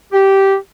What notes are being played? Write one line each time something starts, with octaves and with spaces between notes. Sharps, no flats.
G4